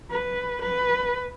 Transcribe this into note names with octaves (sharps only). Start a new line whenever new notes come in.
B4
B4